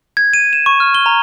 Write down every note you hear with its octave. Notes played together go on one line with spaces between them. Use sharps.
G#6
D#7
E7
C#6
F6
G7
A#5